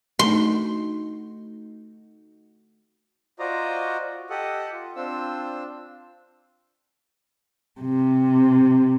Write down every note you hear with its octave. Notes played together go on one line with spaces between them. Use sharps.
A3 D#4 F#4 C6
F4 F#4 C5 D5 D#5 A#5
G4 A4 D#5 F#5
F4
C4 D4 F4 C5 E6
C3